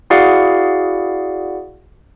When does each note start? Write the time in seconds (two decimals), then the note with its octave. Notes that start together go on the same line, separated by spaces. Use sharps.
0.10 E4 F#4 G#4 D5 F5 F#5